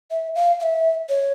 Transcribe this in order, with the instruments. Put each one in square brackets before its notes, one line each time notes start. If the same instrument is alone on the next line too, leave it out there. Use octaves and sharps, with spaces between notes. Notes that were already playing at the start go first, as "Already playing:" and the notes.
[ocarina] E5
F5
F5
E5
C#5